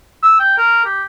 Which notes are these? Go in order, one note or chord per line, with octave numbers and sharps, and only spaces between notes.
E6
G5
A#4
G4